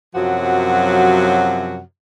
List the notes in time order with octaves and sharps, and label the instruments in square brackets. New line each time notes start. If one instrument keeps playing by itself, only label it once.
[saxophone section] F#2 C3 F3 F#3 F#4